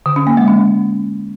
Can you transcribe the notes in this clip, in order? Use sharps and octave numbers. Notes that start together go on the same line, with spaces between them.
D3
C#4
A#3
G#3
C#4